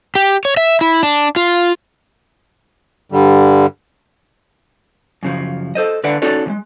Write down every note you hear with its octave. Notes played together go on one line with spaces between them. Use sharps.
G4
C#5
E5
E4
D4
F4
G2 D3 G3
F#2 C#3 F3
A4 C5 D#5
D3 B4 D5 F5 F#5
C#4 D#4 F#4 A4 C#5 D5
D2 G#3